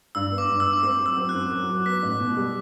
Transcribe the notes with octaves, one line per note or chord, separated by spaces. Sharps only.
G2 E6
B3
D6
G2
E6
G2
D6
C4 E6
F#3
E6
C4
F#6
F#2
F#3
F#3
B3 B6
A1
B2
G3